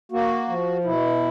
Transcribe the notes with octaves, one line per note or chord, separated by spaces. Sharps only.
A#3 F#4
F3
B2 E4